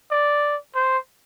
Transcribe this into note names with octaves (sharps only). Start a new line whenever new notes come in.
D5
C5